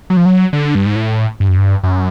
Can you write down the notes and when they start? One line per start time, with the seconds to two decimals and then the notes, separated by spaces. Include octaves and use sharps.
0.10 F#3
0.17 F3
0.25 F#3
0.53 D3
0.75 G2
0.86 G#2
0.96 A2
1.40 G2
1.49 F#2
1.58 G2
1.83 F#2